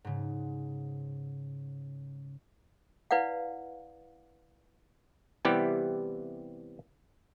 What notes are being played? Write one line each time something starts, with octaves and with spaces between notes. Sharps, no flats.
G#2 C#3
E4 B4 D5 F5 F#5
C3 E3 G3 B3 E4 G4